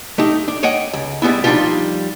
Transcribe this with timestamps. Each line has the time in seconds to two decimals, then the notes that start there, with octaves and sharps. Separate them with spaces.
0.18 A3 D#4 G4
0.48 D4
0.63 C#5 D#5 F#5 G5
0.94 C#2
1.22 G3 G#3 B3 E4
1.44 F3 G3 D4 D#4 F4 G4